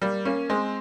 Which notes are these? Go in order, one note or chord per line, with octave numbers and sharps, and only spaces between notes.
G3 A#3
A#3 C#4
G#3 C4